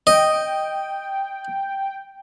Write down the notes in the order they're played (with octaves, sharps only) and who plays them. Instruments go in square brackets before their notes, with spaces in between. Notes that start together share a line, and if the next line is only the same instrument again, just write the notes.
[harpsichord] D#5 [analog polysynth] G5